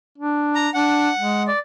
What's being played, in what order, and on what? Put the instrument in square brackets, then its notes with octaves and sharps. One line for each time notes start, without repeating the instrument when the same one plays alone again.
[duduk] D4
[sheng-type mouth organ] A#5
[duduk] D4 [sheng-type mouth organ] F#5
[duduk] G#3
[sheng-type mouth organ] D5